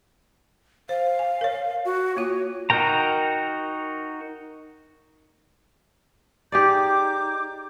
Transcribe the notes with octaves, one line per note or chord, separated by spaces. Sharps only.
C5 F5
G#5
A#4 C#5
F#4
A#3 F4 F#4 C#5
D#4 F#4 A#4 G5 A#5
D#4 G4 G#4 D5 D6 G6